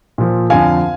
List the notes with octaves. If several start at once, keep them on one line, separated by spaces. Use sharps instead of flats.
A#2 F3
F2 D3 F3 F5 G#5